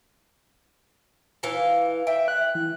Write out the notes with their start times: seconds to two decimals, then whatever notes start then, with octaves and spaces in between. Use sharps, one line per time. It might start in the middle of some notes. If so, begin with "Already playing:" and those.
1.43 E3 F5
2.07 E5 G5
2.28 F#6
2.55 E3